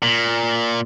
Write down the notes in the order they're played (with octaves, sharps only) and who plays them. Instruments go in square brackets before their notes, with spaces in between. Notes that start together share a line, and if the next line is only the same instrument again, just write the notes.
[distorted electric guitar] A#2